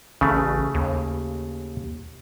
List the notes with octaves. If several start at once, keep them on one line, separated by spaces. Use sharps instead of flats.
A1 C#3 A3
D#2